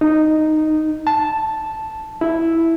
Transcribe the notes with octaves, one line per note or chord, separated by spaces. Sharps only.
D#4
A5
E4